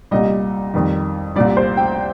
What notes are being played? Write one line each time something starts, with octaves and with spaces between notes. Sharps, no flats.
C2 A#2 G3 D#5
F2 D#3 G3
C2 A#2 G3 D5
C5
G5